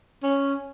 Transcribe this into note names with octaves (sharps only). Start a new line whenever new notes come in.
C#4